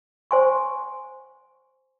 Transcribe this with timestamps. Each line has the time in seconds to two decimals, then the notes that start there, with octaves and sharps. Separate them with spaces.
0.31 C5 F#5 G#5 C6 C#6